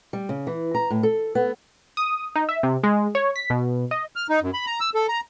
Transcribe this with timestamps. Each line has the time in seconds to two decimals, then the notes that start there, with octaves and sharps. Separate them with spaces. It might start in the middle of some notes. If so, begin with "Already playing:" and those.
0.13 G3
0.29 C#3
0.47 E3
0.75 A#5
0.90 A2
1.03 A4
1.35 B3
1.97 D#6
2.36 D#4
2.49 E5
2.63 C3
2.83 G#3
3.15 C#5
3.36 B6
3.50 B2
3.91 D#5
4.16 F6
4.29 D#4
4.42 F#2
4.54 B5
4.66 A#5
4.80 E6
4.95 A4
5.09 A#5